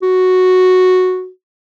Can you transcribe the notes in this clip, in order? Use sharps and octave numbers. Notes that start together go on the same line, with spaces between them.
F#4